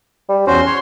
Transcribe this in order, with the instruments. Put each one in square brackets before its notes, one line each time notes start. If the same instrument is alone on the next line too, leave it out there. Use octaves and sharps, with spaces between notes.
[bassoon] G3
[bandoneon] E2 F#4 C5 [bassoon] C#4 [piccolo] C6
[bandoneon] C#5